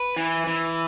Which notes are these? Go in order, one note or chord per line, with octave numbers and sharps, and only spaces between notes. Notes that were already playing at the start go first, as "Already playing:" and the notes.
Already playing: B4
E3
E3